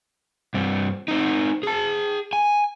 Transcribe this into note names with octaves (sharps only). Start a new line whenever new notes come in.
G2 C4
C4 D#4
G#4 A5
G#5